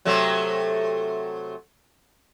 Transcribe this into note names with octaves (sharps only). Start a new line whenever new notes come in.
C3 F#3 A3